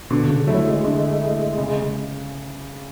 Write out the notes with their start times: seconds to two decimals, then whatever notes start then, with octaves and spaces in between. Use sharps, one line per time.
0.11 B2 D3
0.30 C#3
0.47 F#3 A3 E4
0.66 G#3
0.84 D3
1.22 A3 E4
1.57 C#3